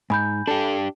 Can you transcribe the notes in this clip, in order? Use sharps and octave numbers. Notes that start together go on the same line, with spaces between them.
G#2 G#5 B5 G6
D4 G4 A4